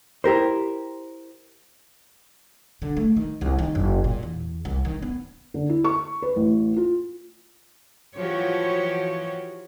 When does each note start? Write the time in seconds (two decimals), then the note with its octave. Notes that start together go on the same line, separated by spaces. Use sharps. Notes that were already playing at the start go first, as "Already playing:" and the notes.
0.24 E4 G4 A#4 C5
2.82 D3
2.97 A3
3.17 D#3
3.41 C2
3.59 D#3
3.75 F#1
4.04 A#2
4.23 E2
4.65 C2
4.85 D#3
5.02 B3
5.54 D3
5.69 E4
5.84 C#6
6.22 B4
6.36 A1
6.76 F4
8.16 E3 F3 F#4 G4 C#5